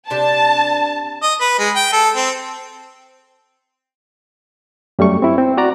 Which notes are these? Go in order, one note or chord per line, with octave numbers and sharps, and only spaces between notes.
C3 D4 G4 A5
D#5
B4
G#3
G5
A4
C4
F#2 G3 A3 C#6
C4 E4
C4
F#4 D5 A#5